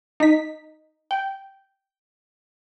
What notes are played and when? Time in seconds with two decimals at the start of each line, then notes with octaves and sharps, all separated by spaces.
0.20 D#4 B6
1.11 G5